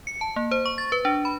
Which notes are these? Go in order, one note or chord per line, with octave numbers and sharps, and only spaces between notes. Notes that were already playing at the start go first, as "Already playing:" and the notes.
C#7
A5
A#3
C5
C#6
A6
B4
D4
B5